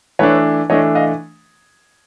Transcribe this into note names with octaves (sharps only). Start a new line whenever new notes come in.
E3 A3 D4 B4 C#5
E3 A3 D4 C#5 D#5
D#5 F5